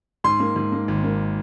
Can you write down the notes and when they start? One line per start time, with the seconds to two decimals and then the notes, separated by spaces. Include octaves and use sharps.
0.24 G#2 C6
0.40 A#3
0.56 G#2
0.72 A#3
0.88 G#1
1.03 A#3